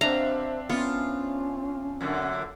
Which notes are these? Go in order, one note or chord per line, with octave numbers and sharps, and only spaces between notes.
B2 C4 D4 C5 E5 F5 A#5
B3 C#4 F4
F#2 A#2 D3